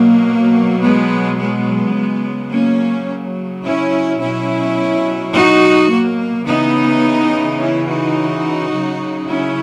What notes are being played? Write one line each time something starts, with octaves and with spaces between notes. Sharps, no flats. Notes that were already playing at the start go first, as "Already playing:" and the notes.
Already playing: B2 F#3 A#3
G#3 B3
G#3 B3
C#3 F#3
A#3 C#4
C#4 E4
B2 F#3 C#4 E4
D#4 F#4
A#3
C#3 E3 B3 D#4
C#4 E4
D#4 F#4
C#3 F#3
C#4 E4